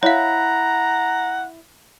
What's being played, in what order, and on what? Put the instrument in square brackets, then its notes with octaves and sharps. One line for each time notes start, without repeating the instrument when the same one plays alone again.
[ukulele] E4 [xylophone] C#5 F5 [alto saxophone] F#5 [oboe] A#5